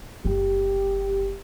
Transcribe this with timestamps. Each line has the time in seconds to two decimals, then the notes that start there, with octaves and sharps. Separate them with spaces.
0.25 F#1 G4